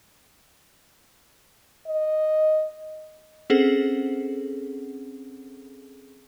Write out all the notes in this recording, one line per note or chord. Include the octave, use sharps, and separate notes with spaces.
D#5
C4 C#4 G#4 A4 C5 F#5